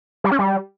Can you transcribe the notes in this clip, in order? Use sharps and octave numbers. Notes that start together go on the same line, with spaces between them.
G3
C#4
G3